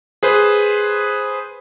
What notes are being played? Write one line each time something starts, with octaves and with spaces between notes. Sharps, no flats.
G#4 B4 C5